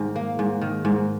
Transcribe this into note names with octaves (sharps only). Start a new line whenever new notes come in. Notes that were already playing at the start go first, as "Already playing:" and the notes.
Already playing: G#2 D#3
A#3
G#2
D#3
G#2